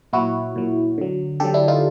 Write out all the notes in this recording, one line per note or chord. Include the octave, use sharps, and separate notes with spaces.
A#2 F#3 E4 F#4
A#2 F#3
D3 F#3
D3 F#3 G4 A4
D4 E4
D#4 F4